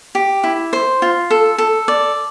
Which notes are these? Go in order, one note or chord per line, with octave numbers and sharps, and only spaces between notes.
G4
E4
C5
F4
A4
A4
D5